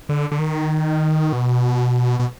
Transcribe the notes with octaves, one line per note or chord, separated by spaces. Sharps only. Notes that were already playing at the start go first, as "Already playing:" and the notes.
D3
D3
D#3
B2
B2